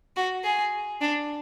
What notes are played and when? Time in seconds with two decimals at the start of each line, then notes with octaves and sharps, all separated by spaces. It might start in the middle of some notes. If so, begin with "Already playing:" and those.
0.17 F#4
0.44 G#4
1.01 D4